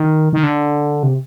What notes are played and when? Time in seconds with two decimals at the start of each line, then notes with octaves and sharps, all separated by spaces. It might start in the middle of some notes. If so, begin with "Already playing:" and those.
Already playing: D#3
0.33 D#3
0.43 D3
1.03 C3